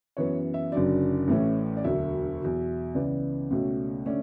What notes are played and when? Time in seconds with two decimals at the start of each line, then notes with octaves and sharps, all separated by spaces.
0.17 F#2 E3 B3 C#5
0.54 E5
0.72 F#1 F#2 D3 F#3 D5
1.28 A1 A2 E3 A3 C#4
1.77 D5
1.84 E1 D2 D3 F#3 E5
2.40 E2 B2 F#3
2.95 C#2 C#3 E3 B3 D5
3.51 C#2 B2 A3 C#4
4.06 D3 A3 C#4 D5